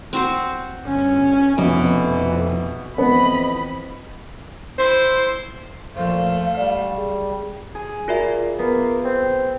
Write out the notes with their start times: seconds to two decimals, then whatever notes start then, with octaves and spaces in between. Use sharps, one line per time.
0.13 C4 F#4 C5
0.86 G1 C#4
1.58 F1 F2 B2 E3
2.98 F2 E3 B3 C4 D#5 B5
4.79 E4 C5
5.96 E2 A#2 F3 A3 C5 F5
6.57 G3 D5
6.94 B1 G#4
7.75 G#4
8.08 A#2 F4 F#4 E5
8.59 A#3 B3
9.05 C4